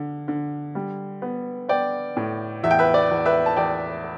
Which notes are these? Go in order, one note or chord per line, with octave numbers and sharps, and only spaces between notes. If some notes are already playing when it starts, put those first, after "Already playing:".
Already playing: D3
D3
G3
B3
B3 D5 G5
A2
E2 E5
G5
B4 E5
D5
E2
B4 E5
A5
E2 D5 G5